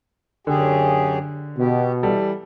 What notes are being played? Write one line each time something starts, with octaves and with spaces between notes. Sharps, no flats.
F#2 D3 G4 G#4
B2 G4
E3 G3 A4